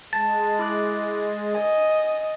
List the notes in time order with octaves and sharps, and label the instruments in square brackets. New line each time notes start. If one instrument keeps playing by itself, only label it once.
[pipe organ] G#3 [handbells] A5 [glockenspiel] A6
[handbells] E4 D6 F#6
[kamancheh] D#5 [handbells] G#5